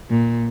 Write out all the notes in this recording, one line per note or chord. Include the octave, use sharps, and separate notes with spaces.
A#2